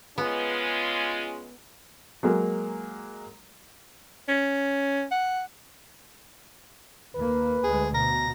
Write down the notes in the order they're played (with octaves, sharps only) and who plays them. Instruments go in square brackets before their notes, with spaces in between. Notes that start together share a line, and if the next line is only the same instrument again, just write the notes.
[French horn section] G#3 C#4 F4 [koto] B3
[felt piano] F#3 G#3 A#3
[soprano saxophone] C#4
F#5
[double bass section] D#2 A#3 [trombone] B4
[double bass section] D2 G#3 [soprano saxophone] G#4
[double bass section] B2 [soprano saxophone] A#5